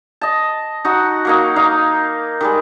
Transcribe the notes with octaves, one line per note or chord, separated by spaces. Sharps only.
D#5 A5
D#4 F#4 F#5
F#3 A#3 D#4
D#4 D#5 F5
D#3 G3 G#3